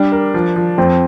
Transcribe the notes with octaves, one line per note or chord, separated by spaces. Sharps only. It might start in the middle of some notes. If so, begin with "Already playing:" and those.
Already playing: G3 D4
A#4
F3
F3
F2 C4